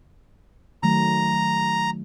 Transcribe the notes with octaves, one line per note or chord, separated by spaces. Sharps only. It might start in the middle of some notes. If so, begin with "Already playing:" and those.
D#3 F#3 A3 A#5